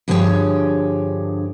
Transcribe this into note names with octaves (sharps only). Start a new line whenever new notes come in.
G2 D3 F3 G4 G#4 C#5